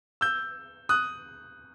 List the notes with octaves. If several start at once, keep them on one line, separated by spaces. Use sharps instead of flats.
E6 G6
D#6 F#6